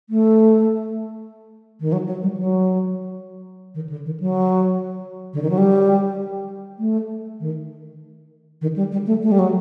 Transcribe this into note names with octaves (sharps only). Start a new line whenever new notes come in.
A3
D#3
F#3
F#3
G3
F#3
D#3
D3
D#3
F#3
D3
D#3
F#3
G3
A3
D#3
D#3
G3
G3
A3
A3
G3
F#3